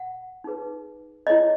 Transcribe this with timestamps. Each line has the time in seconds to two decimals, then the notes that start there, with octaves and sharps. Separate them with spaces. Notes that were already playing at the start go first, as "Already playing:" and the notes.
Already playing: F#5
0.44 D#4 G#4 B4
1.27 E4 G#4 C#5 D#5